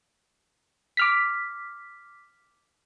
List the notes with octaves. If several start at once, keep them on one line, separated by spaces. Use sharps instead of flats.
D6 F6 B6